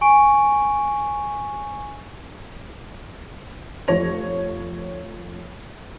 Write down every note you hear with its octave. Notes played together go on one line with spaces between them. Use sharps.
G#5 C#6 D7
F1 F3 C#5 A#6 F7